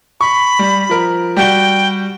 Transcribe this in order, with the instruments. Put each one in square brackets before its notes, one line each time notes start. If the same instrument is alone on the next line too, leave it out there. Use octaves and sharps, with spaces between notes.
[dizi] B5 [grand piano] C#6
[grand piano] G3
F3 A#4
[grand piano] G3 F#4 G7 [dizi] G5